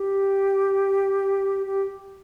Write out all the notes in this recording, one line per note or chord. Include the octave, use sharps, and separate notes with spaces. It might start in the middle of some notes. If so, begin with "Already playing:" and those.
Already playing: G4
G4